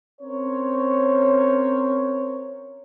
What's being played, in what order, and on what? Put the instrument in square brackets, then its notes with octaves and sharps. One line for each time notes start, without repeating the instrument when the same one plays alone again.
[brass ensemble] C4 C#4 A#4 C5 C#5